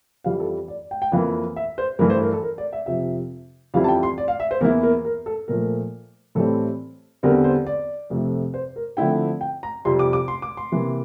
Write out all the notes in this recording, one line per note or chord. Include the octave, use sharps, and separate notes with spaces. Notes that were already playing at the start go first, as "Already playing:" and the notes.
F2 E3 G3 F5
A4
D5
G5
G5
F2 E3 A#3 F5
E5
C5
G2 E3 A3 E4 A#4
C5
A#4
A4
A#4
D5
E5
F2 C3 F3 E5
F2 E3 G3 C4 E4 F5
A5
G5
C6
D5
F5
E5
C5
E2 E3 A#3 E4 A#4
A#4
A#4
A4
A#2 F3 A3 A#4
A2 E3 G3 C4 A4
E2 D3 G3 C4 A#4
C5
D5
F2 C3 F3 A3
C5
A#4
D3 F3 A3 C4 E4 G5
G5
A#5
F2 C3 G3 C6
D6
D6
C6
D6
C6
C3 E3 A#3